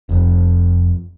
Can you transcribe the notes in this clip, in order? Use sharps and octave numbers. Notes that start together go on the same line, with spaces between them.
F1 F2